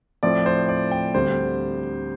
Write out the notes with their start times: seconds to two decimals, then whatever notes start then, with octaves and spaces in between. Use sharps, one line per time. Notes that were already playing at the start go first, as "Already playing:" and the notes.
0.23 A2 F3 C4 D5
0.46 C5
0.69 D5
0.91 G5
1.14 D2 D3 G3 C4 C5